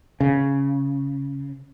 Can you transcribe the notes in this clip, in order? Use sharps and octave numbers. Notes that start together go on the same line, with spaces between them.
C#3